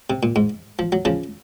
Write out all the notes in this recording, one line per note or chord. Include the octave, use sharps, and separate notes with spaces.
C3
A#2
G#2
F3
F#3
C#3 F3